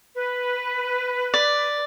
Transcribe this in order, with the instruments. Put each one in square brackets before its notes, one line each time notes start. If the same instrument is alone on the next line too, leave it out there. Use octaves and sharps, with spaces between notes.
[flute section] B4
[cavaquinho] D5